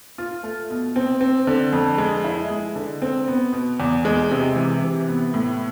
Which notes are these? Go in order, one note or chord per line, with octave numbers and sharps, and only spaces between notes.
F4
A3
B2
C4
C4
D3
F2
G#3
E4
G#3
D3
C4
B3
B2
E2
G#3
C3
E3
C3
B3
A2